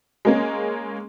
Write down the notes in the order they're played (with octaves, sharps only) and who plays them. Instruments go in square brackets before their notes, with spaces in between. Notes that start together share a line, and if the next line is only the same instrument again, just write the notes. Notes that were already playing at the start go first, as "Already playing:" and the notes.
[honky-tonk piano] G#3 A#3 C#4